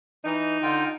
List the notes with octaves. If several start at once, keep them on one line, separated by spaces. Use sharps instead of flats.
E3 D#4
D3 F4 G5